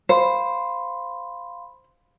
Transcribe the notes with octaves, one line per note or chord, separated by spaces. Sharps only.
C5 F5 B5 C6